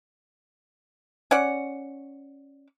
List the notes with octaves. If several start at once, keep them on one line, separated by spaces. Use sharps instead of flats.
C#4 D5 F#5